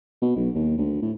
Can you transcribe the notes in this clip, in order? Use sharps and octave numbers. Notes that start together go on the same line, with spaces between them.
B2
B1
D#2
D2
A2